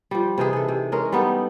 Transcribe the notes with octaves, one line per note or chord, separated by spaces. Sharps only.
F3 G3
C3 E3 D#4 G#4
G#4 A4
C3
G#3 C#4 G#4 A#4
G3 B3 D#4 A4